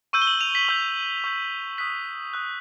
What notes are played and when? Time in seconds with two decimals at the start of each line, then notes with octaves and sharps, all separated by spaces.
0.13 C#6 E6 G6 D#7
0.22 G7
0.27 F#7
0.41 F7
0.55 B6
0.69 C#6 E6 G6
1.24 C#6 E6 G6
1.78 D#6 F#6 B6
2.33 D#6 F#6